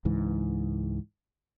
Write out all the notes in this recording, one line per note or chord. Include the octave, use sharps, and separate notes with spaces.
C#2 G#2 E3